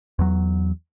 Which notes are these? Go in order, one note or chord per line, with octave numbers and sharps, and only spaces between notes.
E2 F#3